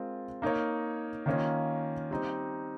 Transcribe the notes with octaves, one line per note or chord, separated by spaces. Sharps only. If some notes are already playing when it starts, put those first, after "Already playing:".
Already playing: G#3 C4 F4 A#4
A#3 D#4 A#4 C#5
D#3 A#3 C#4 F4
G3 C4 D#4 G4